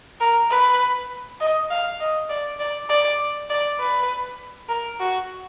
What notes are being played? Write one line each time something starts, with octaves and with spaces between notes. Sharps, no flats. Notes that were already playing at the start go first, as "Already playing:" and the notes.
A#4
B4
D#5
F5
D#5
D5
D5
D5
D5
B4
A#4
F#4